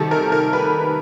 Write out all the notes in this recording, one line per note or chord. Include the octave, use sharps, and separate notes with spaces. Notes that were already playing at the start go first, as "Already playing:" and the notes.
Already playing: C3 D#3 G3 A4
A#4
A#4
B4